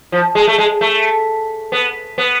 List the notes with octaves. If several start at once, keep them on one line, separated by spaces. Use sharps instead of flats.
F3
G#3
A3
G#3
A3
B3
B3